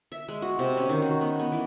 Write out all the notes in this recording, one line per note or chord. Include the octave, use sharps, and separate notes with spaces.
E5
G#3
F#4
C3
C#4
D#3
F#4
B3
B3
E3